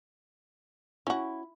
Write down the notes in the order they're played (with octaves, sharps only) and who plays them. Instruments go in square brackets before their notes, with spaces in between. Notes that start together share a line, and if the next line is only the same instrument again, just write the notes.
[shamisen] C#4 F#4 [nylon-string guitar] E4